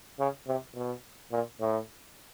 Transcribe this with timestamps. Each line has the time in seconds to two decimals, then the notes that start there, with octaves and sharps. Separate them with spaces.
0.19 C#3
0.47 C3
0.75 B2
1.32 A#2
1.60 A2